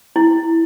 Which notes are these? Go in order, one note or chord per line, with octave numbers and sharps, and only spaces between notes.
E4